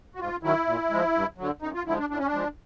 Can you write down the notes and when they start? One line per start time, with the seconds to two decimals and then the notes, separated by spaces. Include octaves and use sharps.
0.15 F#4
0.19 G#2 F4
0.43 D#3 F#3 E4
0.67 A#2
0.91 F3 G#3
1.14 G2
1.38 D3 F#3
1.62 F#2 D#4
1.74 F4
1.86 D3 F3 G#3 E4
1.98 D4
2.10 A2 D4
2.18 C#4
2.26 D4
2.34 F3 G#3